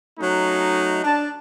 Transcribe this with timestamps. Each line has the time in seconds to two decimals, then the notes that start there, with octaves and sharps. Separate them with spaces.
0.19 F#3 A3 C#4 D#4
1.04 D4 A5